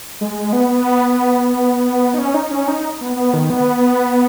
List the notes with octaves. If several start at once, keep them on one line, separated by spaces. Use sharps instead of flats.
G#3
B3
D#4
C#4
D#4
C#4
D#4
B3
B3
D#3
B3